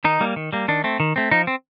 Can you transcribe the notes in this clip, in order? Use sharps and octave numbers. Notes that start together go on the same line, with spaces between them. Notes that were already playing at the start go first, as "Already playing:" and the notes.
D#3 D#4
G3 A#3
D#3
G3 A#3
D#3 D4
A3 C4
D#3
A3 C4
F3 D#4
C4